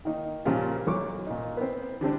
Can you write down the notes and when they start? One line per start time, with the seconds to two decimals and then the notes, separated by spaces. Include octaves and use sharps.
0.05 D#3 A#3 D#4
0.45 A#2 C#3 F3 G3 A#3
0.87 B1 F#3 C#6 D6
1.27 A#2 D#4
1.57 B3 C4
2.01 D3 G3 C4 D4